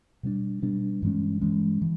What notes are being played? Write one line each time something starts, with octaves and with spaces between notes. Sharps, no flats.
B2 G3 B3 D4
B2 G3 B3 D4
G2 E3 G#3 C#4
G2 E3 G#3 C#4
E3